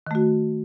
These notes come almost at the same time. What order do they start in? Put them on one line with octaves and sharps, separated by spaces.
D#3 A3 F#4